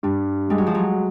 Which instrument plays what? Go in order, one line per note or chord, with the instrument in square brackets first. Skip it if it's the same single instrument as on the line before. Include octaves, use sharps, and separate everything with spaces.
[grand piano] G2 [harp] G3
[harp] G3 [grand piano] G#3
[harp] F#3
F3
F#3